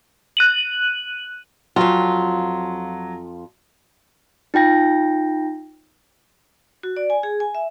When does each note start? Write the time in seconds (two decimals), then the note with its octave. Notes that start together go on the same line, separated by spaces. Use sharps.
0.37 F#6 D#7 F#7
1.76 F2 F#3 F4
4.54 D#4 F4 G5 A#6
6.83 F#4
6.96 D5
7.10 G#5
7.23 G#4
7.40 G#5
7.55 E5